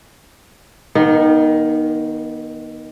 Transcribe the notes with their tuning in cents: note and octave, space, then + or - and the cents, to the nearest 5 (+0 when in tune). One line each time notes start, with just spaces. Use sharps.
D#3 +0 B3 -35